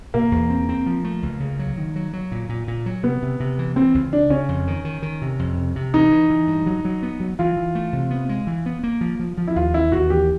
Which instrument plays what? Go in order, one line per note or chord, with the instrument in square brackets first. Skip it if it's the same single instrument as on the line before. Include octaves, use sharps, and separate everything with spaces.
[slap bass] B2 [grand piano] A#3
[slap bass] E2
C4
C4
F3
A3
C#2
C#3
F#3
D#3
F#3
F#3
A#2
A#2
A#2
F#3
[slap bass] C3 [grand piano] B3
[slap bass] C3
C3
E3
[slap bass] E3 [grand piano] C4
[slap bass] C#2
[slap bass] C#3 [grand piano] D4
[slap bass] C#3 [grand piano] C#4
[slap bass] F2
D#3
D#3
D#3
C3
F2
C3
C3
[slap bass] E3 [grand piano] D#4
[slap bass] E3
E3
G2
F#3
F#3
B3
F#3
[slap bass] E3 [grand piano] F4
[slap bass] E3
A3
C3
B3
G#3
E3
B3
A#3
F3
F3
F3
[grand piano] E4
[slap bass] D#2 [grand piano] F4
[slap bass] D#2 [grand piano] E4
[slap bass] D#2 [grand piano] F#4
[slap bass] E3 [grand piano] G4